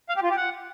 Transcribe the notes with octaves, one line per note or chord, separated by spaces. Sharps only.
F5
G4
F4
G4
F#5